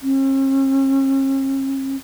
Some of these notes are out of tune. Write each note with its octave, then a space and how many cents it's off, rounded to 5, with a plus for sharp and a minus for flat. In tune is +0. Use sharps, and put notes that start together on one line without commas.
C#4 -45